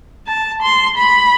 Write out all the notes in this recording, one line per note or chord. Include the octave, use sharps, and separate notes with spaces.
A5
C6
B5